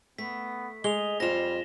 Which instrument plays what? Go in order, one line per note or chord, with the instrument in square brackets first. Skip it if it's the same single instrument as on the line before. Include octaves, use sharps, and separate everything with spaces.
[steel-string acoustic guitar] A3 [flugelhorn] B3 [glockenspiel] B6
[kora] G#3 G#4 [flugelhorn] D#5 [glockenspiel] F7 G7
[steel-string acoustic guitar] F2 F4 [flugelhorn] G3 [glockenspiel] A#6 E7